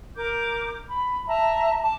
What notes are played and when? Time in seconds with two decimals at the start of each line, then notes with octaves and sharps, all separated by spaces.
0.16 A#4 D6 G6
0.88 B5
1.28 E5 A5 A#5
1.82 A5 D6